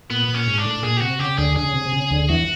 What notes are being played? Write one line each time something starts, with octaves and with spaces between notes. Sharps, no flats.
A#2 B3
A#2
C#4
G#2
D4
A2
A#2 G#4
G4
C3 F#4
C#3 G4
D2 D3 G#4
G#4
C#3
C3
C3
C#3
D2 D3
E2 E3 F#4